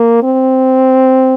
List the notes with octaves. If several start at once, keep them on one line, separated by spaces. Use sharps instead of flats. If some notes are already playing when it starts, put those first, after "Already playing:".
Already playing: A#3
C4